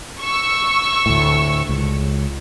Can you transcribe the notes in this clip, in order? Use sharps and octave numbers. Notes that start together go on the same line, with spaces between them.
C#6 E6
D2 A2
C#2